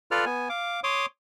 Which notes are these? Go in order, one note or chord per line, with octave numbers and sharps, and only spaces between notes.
F4 A4 B4 D5 F6
B3 G#5
F5 D6
C#5 C6 D6 D#6